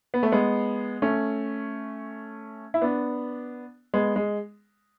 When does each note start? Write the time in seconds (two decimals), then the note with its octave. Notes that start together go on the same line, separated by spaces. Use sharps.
0.14 B3
0.23 A3
0.32 G#3 B3
1.02 A3 C#4
2.74 E4
2.82 B3 D4
3.94 G#3 B3
4.16 G#3